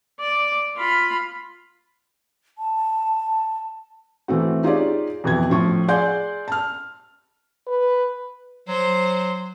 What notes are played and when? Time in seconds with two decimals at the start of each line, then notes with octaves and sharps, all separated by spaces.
0.20 D5
0.77 F4 B5
2.58 A5
4.28 E3 A3 C4 F#4
4.64 D#4 F4 G4 G#4 C#5 D5
5.24 F2 B2 E3 G#6
5.50 A2 F3 C#6
5.88 G#4 D5 F#5 G#5 C6 G6
6.48 A5 F6
7.67 B4
8.68 F#3 C5